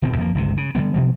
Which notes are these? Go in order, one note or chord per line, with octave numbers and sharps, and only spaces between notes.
D1 B2 D#3 C4
F2 F3 A#3
G1 C#2 C3
C#3
D3 F3 G3 B3
B2 F3 G3